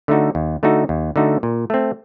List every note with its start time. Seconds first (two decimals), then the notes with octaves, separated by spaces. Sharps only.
0.08 D3 A3 D#4 F#4
0.35 D#2
0.63 D3 A3 D#4 F#4
0.89 D#2
1.16 D3 A3 D#4 F#4
1.43 A#2
1.70 A3 C4